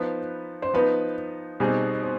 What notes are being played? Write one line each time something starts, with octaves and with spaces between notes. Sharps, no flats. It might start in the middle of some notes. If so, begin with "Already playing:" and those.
Already playing: F3 B3 D#4 B4
C5
F3 B3 D#4 B4
B2 G3 C4 D#4 G#4
C5